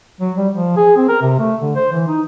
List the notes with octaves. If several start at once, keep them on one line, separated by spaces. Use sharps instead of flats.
F#3
G3
F3
G#4
C4
A#4
C3
A3
D3
C5
E3
D#4